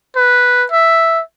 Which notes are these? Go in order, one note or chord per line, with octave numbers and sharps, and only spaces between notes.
B4
E5